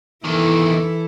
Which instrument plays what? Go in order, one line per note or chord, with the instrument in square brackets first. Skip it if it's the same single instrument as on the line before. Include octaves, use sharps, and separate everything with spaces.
[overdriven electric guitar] E2 D#3 [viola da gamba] E3 E4 A4